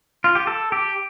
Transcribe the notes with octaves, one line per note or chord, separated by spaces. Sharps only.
F4
G4
A4
G4